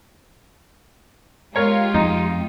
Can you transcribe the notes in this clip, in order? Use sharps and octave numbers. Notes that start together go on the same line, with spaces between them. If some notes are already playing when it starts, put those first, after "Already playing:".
G#3 F4 G4 A#4 C#5 A#5
F2 D#4